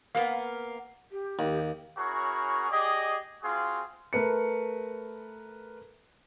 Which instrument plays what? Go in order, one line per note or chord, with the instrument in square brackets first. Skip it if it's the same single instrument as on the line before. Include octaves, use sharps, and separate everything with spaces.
[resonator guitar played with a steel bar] A#3 B3 [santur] F5
[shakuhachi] G4
[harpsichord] D#2
[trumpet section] C#4 E4 F#4 G#4 A#4 C#5
G4 G#4 D5 D#5
C4 F4 F#4 G#4
[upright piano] A3 A#4 B4 C#7